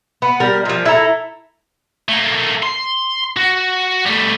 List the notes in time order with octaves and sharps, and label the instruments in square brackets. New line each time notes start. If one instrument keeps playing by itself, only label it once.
[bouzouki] B3
G3 A#4
A#2 F3
E4 A4 A#5
[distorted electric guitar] A3 A#3
C6
F#4
G3 A3